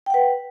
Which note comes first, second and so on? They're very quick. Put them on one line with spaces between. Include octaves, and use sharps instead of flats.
G5 F#5 B4